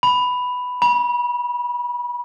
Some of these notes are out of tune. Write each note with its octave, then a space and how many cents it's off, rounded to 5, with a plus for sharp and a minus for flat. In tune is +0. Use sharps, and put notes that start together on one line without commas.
B5 +5
B5 -30